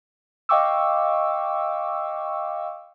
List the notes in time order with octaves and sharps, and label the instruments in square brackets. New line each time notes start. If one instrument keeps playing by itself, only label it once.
[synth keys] D#5 F5 G5 C#6 D6 E6